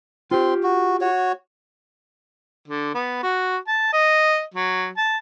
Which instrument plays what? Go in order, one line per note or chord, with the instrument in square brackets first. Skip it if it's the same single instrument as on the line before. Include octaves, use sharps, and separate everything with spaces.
[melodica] C4 C6 [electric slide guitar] F4 G4
[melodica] F#4
F#4 C#5
[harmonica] D3
B3
F#4
A5
D#5
F#3
A5